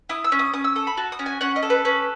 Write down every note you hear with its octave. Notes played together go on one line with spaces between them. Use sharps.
E4 D#6
E6
C#4
D#6
C#4 D#6
E6
A4 D#6
B5
F#4 A5
D#6
C#4
G#5
C#4 F#5
D#5
A4
B4
C#4 B4